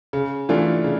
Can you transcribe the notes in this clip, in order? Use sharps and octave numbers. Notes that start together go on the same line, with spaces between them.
C#3
E3 A3 D4 F4
C#3